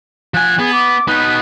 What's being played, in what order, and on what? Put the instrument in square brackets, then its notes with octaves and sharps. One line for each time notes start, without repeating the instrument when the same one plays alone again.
[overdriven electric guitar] F3 G#5 [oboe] F#5
[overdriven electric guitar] B3 [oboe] G#4
[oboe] D6
[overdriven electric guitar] B3 D#4 [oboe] B4